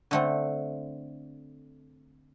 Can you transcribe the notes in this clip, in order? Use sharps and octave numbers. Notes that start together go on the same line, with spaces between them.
D3 A3 C4